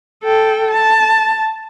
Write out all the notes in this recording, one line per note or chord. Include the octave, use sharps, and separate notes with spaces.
A4 G5
A5